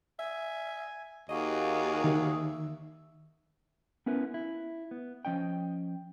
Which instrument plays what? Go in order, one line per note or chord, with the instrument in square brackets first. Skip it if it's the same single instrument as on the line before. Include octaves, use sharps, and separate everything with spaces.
[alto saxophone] E5 [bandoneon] G#5
[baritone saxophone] D#2 [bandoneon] A#3 F#4 G#4 [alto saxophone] D#5
[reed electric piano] D#3 [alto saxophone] E5
[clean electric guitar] B3 C#4 E4 A#4 B4
E4
B3
F3 C#4 D#5 G5